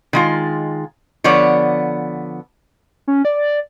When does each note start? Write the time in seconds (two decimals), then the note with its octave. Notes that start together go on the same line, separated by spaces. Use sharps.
0.13 D#3 G#3 F4
1.24 D3 F3 B3 C#5 D5
3.08 C#4
3.25 D5